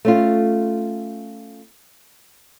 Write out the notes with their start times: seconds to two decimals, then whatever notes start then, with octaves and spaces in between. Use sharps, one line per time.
0.05 A3 C#4 F4